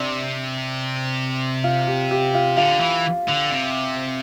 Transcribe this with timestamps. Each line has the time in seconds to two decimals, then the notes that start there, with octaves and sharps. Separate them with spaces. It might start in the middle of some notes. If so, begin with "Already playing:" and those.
Already playing: C3 D4
1.64 F4
1.87 G4
2.11 G4
2.34 F4
2.57 D3 F4
2.80 E3
3.28 D3
3.51 C3